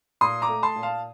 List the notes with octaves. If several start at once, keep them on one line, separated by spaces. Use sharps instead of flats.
A#2 C6 D#6
A#5 D6
A3
A5 C6
A#2
F5 A5